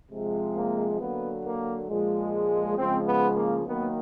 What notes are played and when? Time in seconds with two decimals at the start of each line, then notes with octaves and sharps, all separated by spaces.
0.10 C3 F3 G#3
0.54 A#3
0.99 D3 F#3 A#3 B3
1.44 A#3
1.88 A#2 F3 G#3
2.77 C#3 F3 G#3 C4
3.06 B3
3.35 A#3
3.64 D#3 F#3 A#3 B3